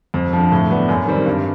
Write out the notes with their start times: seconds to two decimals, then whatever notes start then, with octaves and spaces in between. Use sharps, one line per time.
0.14 F2
0.33 D3 F3
0.52 A2
0.70 F#3 B3 D4
0.89 F#2
1.08 D#3 G3 C4
1.26 G2